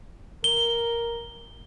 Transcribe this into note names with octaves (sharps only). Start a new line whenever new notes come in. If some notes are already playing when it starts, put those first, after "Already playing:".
A#4 G7